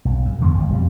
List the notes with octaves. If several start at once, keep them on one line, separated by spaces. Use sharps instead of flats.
B1
F#2
E2 D3 D#3 B3
G1 C#2
F2 B2 G3